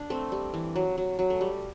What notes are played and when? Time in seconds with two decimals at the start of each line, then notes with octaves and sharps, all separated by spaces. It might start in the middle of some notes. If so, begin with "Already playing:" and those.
Already playing: D4
0.10 A3 C4
0.32 G3
0.54 E3
0.76 F#3
0.98 F#3
1.19 F#3
1.30 A3
1.41 G3